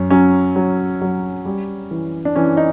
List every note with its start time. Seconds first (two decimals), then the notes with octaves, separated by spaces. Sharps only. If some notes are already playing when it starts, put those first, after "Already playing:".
Already playing: F#2 C#4
0.10 F#3 C#4
0.56 F#3
1.02 F#3
1.45 G3
1.91 E3
2.25 D4
2.36 E3 C#4
2.57 D#4